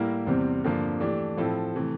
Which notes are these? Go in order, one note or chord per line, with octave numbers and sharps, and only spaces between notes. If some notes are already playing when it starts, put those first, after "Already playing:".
Already playing: A2 G3 A#3 E4 A#4
E2 C3 G3 C4
G2 D3 F3 A#3
E3 A3 D4 G4
A2 F3 C4 E4 A4
C3 E3 A3